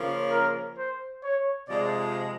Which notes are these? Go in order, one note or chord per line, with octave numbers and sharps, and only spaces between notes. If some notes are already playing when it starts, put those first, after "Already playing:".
Already playing: C#3 F3 A#3 C#4 F4
A#4
C5
C#5
F2 C3 F3 G#3 D5